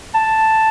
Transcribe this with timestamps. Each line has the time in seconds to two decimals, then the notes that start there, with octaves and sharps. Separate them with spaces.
0.14 A5